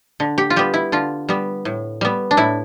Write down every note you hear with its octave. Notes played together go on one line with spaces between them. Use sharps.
D3
G4
F4
G3 B3 G4
E4
D3 F4
G3 B3
A2
G3 B3
D4
A2 E4